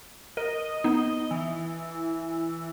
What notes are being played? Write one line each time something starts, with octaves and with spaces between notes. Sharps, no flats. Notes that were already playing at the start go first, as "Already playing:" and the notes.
A#4 D#5
B3 D#4
E3